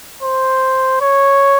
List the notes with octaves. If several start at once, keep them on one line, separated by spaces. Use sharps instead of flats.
C5
C#5